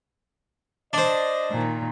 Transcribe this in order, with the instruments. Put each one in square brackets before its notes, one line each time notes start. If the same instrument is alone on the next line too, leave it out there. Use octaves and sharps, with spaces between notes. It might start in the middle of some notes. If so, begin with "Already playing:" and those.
[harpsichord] D4 C5 [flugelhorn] D#5
[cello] A#2 D#3